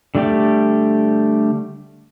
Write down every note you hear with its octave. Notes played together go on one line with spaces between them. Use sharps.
D3 G3 A3 G4 D5